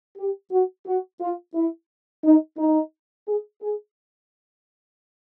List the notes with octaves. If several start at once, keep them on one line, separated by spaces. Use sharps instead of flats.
G4
F#4
F#4
F4
E4
D#4
D#4
G#4
G#4